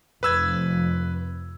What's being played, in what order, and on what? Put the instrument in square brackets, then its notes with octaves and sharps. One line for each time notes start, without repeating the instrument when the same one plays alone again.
[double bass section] F1 F2 [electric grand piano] B4 E6 G#6